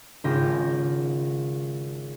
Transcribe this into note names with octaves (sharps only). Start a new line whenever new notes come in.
G#1 C#3 F4 G4 A#6